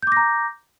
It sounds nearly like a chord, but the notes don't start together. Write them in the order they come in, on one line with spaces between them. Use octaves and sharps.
G6 D6 A#6 A#5